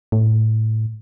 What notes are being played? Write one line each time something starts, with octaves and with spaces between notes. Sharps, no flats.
A2